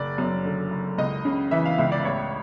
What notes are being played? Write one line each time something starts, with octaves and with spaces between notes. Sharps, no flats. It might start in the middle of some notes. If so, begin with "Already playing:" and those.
Already playing: F#1 D5
F#2
D3
F#1
C#2 D#5
C#3
E3 E5
F5
C#2 E5
D5
A1 C#5